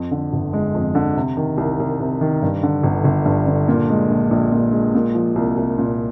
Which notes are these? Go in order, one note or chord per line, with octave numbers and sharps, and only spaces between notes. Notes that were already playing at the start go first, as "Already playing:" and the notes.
Already playing: F2
D3
G1
G#3
F2
D3
C3
D#3
C2
C2
C3
D#3
G2
D3
G1
G1
G2
D3
A#2
G#3
A#1
A#1
A#2
G#3
A#2
F3
C2
C2
A#2